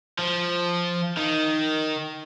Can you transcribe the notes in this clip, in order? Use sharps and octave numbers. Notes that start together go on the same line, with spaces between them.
F3
D#3